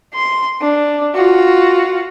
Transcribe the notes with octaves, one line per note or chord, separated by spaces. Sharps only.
C6
D4
F4 F#4